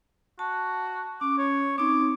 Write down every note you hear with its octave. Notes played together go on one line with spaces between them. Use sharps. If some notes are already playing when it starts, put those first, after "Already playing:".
F#4 A5
C#4 D6
C#5
C4 D#4 D6